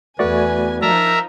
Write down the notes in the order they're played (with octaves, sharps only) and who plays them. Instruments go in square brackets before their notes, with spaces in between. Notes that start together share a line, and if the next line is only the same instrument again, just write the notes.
[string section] E2 G#5 [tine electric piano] A3 F#4 D5 [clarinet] B4
[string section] F3 D#4 [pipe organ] A#4 E5 A#5 [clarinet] A5